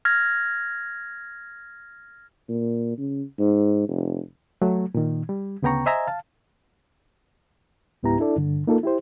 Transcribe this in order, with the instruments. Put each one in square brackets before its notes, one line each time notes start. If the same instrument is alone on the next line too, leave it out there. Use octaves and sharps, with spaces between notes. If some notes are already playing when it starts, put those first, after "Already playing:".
[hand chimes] F6 G#6 A#6
[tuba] A#2
C#3
G#2
F1
[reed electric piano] F#3 A3
A#2 D#3
G3
D2 C#3 B3 G5 A#5 C#6
C5 D#5 E5 G#5 A#5
F5 A5
C#2 G#2 B3 E4 G4 A#5
D4 E4 A4 D5
G2 D3
A#3 D#4 F4 A4 A#4
E4 G4 C5